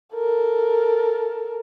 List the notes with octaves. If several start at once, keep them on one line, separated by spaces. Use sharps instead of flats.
A4 A#4